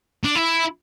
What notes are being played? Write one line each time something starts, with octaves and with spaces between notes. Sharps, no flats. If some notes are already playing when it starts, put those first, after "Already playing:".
D4
E4